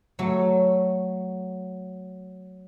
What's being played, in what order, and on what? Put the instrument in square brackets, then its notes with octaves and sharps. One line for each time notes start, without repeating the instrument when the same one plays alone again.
[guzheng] F#3 A3